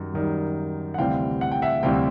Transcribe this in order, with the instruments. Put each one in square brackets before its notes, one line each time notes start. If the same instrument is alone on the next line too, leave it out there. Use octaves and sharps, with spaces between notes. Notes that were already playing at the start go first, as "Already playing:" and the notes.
Already playing: [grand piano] F#2 D#3 G3
F#2 D#3 G3
F#5
D2 C3 E3 G3 F5 G5
F#5
G5
E5 F#5
D2 C3 E3 G3 F5 G5